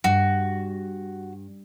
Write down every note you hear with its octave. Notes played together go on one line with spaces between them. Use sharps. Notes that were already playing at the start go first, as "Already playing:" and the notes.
G2 F#4